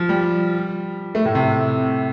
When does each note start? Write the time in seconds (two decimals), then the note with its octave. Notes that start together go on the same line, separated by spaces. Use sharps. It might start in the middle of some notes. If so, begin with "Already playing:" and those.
Already playing: F3
0.09 G3
1.15 A3
1.25 A2
1.35 C3